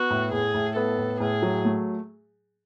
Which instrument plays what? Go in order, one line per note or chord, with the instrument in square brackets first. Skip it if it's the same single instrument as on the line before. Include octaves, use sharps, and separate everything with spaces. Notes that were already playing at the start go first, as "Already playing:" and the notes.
Already playing: [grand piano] B3 [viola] F#4
[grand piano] A2
[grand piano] A2 [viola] G#4
[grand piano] A2
[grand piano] B3 [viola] A4
[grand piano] A2
[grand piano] A2 [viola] G#4
[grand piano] F#3
A3